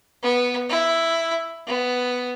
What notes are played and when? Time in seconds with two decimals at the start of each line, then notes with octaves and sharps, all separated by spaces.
0.23 B3
0.70 E4
1.67 B3